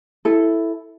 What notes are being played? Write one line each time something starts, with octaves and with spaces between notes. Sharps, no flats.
E4 A4